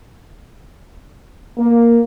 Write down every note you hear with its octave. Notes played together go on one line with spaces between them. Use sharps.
A#3